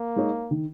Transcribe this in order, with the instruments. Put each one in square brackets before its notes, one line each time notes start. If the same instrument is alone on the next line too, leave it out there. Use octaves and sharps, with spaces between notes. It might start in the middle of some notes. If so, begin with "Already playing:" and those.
Already playing: [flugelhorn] A#3
[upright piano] G#3 D#4 C#5
D#3